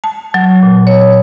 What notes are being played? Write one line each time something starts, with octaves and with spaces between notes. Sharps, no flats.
A5
F#3
A#2
C#5